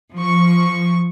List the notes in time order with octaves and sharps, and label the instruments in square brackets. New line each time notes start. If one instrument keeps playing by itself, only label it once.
[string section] F3 C#6